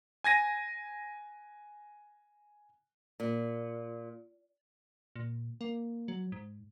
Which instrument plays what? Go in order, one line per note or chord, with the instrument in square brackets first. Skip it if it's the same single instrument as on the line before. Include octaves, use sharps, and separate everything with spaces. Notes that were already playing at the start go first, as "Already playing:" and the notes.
[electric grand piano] G#5 G#6 A#6 D#7
[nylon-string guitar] A#2
[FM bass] A#2
A#3
F#3
G#2